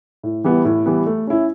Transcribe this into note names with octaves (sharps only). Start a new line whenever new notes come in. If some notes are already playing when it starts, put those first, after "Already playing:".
A2
E3 G3 B3
A2
E3 G3 B3
A3
C#4 E4